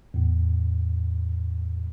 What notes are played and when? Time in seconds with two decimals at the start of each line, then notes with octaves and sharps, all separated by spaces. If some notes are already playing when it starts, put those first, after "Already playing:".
0.14 E2 A2